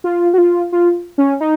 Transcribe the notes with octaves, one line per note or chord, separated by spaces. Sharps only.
F4
F#4
F4
F4
C#4
D#4